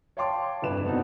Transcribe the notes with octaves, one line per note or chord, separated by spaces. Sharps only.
C#5 F5 G5 A5 C6 D6
F1 G2 E4 B4 E7
B3 C4 D4 D#4 F#4